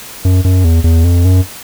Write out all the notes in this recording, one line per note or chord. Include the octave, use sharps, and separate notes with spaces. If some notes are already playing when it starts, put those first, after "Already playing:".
F#2
F#2
E2
E2
F2
F#2